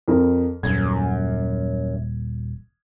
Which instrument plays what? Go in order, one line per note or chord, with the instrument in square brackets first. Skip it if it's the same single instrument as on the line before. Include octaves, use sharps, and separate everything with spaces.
[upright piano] F2 A#4
[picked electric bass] D#1 [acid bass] F#2 [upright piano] G#6